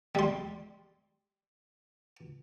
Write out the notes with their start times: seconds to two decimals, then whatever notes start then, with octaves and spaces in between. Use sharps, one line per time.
0.15 G3 C6